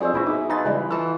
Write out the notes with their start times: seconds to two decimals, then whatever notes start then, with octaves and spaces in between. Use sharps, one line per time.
0.01 F2 G3 G#4 C5 E5
0.14 E1 A#2 E4 F#4 B4 E5 B5
0.26 B1 D#4 E5 D6
0.50 F3 D#4 B4 D#5 G#5 A6
0.65 C#3 E3 G3 G#3 B5
0.91 E3 A4 A5